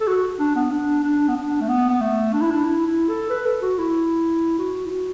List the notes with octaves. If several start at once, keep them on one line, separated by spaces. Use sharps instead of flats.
A4
F#4
D4
B3
D4
D4
B3
D4
A3
B3
B3
A3
D4
E4
D4
E4
E4
A4
B4
A4
F#4
E4
F#4
E4
F#4